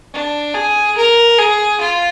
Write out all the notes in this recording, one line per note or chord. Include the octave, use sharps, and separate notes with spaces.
D4
G#4
A#4
G#4
F4